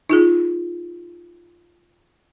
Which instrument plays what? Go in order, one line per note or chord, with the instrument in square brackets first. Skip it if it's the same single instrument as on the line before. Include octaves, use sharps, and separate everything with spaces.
[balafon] D#4 F4 G#4